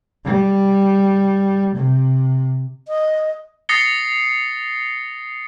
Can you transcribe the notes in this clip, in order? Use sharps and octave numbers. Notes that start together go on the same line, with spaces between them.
G3
C3
D#5
D#6 A6 A#6 C7 C#7 G7